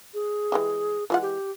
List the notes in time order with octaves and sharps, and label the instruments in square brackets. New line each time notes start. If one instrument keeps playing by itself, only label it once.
[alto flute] G#4
[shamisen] E3 G#3 G4
[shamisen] E3 G#3 F#5 [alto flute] F4
[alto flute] G4